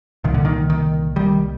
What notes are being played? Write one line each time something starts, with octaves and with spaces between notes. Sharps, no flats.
C2 A#2 D#3
D3
D#3
D#3
D#3 G3